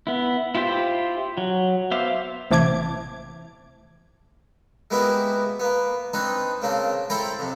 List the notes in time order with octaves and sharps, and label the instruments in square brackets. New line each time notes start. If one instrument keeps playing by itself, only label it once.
[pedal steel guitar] B3 E4
E4 F4 G4 C5 B5
F#3
B3 C5 E5 F5 D6
[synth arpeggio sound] A1 C3 E3 A5 D6 G#6
[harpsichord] G#3 A#3 B3 E4 F#4 G4
A#3 B3
C4 D4 D#4 B4
C#3 A#3 C4 D4
E4 A4 C5 G5 A#5 B5
F2 C3